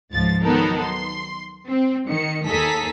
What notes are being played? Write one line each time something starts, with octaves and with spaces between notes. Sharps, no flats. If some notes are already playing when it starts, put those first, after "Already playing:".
C#2 G#2 F3 A6
D#3 F#3 B3 D#4 A4 A#4
C6
C4
D#3 C#7
D#2 G#4 A4 A#5 B6